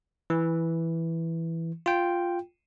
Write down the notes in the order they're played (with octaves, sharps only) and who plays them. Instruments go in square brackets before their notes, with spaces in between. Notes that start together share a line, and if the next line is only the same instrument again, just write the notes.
[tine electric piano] E3
F4 G5